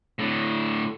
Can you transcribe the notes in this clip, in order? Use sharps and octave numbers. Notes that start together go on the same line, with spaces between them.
A2 D3